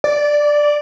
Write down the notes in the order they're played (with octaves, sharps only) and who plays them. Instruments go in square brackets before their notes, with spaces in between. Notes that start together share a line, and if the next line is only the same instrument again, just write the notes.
[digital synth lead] D5